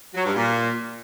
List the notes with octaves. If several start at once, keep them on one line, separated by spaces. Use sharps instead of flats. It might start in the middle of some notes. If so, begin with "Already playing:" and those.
F#3
G2
A#2